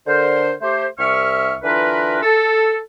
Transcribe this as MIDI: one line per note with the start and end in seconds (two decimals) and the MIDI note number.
0.07 0.53 50
0.07 0.53 70
0.07 0.53 72
0.62 0.87 57
0.62 0.87 67
0.62 0.87 72
0.99 1.56 36
0.99 1.56 76
0.99 1.56 85
0.99 1.56 89
1.63 2.19 50
1.63 2.19 52
1.63 2.19 62
1.63 2.19 65
1.63 2.19 70
1.63 2.19 71
2.22 2.78 69